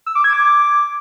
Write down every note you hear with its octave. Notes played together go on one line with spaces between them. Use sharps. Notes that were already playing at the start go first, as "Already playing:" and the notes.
E6
D6
G#6
D6